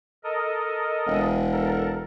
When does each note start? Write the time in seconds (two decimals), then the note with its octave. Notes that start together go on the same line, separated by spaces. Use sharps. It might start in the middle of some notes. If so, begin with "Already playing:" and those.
0.24 A4 A#4 D#5
1.07 E1
1.51 A4 A#4